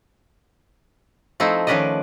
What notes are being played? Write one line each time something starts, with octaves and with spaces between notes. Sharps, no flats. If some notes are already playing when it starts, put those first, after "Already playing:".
F3 A3 C4 D#4 E4
D#3 F3 C#4 B4 D5 D#5